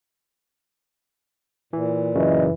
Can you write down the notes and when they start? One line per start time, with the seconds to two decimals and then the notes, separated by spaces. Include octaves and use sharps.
1.73 A#2 E3
2.15 F#2 C#3 E3 D#5